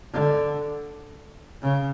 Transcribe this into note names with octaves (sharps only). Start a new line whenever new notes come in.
D3
C#3